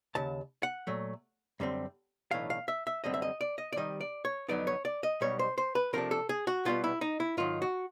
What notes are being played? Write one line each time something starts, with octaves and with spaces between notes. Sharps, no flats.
D#2 C#3 A5
F#5
A#2 F#3 A3
F#2 D3 G3 C4
B1 A2 E3 A3 D4 F5
F5
E5
E5
F#2 D3 G3 C4 D#5
E5
D#5
D5
D#5
D5
C3 D#3 G3 D#5
D5
C#5
F2 D3 F#3 B3 D#4 D5
C#5
D5
D#5
B1 B2 G3 C#5
C5
C5
B4
C3 F3 A3 D4 A#4
A4
G#4
F#4
B2 G3 B3 F4
E4
D#4
E4
G#2 D#3 F#3 F4
F#4